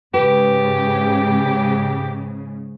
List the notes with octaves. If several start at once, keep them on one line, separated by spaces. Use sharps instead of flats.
G#2 C#3 G4 B4